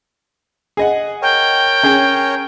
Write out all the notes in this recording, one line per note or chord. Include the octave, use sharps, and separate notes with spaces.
G#4 D#5 F#5
A#4 C#5 G5
C#4 G#4